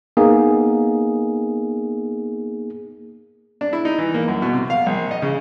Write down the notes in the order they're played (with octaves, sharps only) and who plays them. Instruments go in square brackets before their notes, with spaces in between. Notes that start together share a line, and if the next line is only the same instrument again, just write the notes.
[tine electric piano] A#3 B3 D#4 G#4
[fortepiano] D4
E4
D#4
E3
A#3
F#2
B2
C3
F5
A#1
D#5
C#3